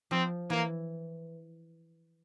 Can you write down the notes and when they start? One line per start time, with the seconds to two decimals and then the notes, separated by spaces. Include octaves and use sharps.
0.11 F3 C4
0.50 E3 A#3